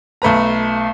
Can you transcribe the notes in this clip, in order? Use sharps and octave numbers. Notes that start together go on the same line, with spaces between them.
B1 A3 B4 A#5